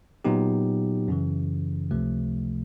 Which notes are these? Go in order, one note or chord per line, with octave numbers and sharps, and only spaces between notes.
A#2 F#3 B3 D#4 G4
F#2 C#3 E3
C#2 C3 F3 A3